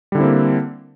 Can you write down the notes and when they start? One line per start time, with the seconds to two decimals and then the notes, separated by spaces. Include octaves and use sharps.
0.12 G3
0.15 D3
0.18 E4
0.20 C4
0.23 A#3